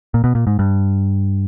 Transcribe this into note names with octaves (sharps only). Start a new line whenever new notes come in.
A#2
B2
A#2
G#2
G2